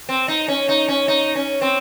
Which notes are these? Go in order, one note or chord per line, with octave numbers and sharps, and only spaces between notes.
C4
D#4
C#4
D#4
C#4
D#4
C#4
C4